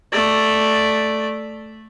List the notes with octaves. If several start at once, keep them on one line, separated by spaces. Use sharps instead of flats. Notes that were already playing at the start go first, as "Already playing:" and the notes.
A3 D5